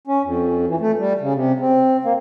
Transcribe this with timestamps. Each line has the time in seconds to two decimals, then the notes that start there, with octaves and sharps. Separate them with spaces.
0.07 C#4
0.24 F2
0.67 E3
0.80 A3
0.99 G3
1.21 C#3
1.34 C3
1.60 C4
2.04 A#3